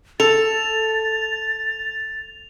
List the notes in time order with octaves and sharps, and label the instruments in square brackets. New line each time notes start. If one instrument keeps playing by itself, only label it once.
[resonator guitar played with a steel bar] A4 [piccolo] A6 [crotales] F7